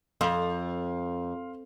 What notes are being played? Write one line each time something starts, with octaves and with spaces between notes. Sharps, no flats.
F2 F5 C6